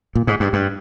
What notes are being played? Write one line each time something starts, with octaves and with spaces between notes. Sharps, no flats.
A#2
G#2
G2
G2